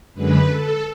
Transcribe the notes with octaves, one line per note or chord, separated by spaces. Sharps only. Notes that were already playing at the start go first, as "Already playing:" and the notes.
F#2 D3 G#3 B4
A4